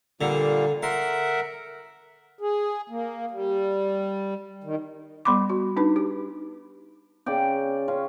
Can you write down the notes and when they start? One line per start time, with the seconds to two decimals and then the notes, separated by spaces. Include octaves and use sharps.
0.21 A#2 D3 G3 A#3
0.83 A#4 E5 F#5 C6
2.39 G#4
2.90 A#3
3.31 G3
4.64 D#3
5.25 G3 B3 B5 C6 D6
5.50 F#4
5.77 D4 D#4 B4
5.96 G4
7.26 C#3 D5 G5
7.88 C#4 F4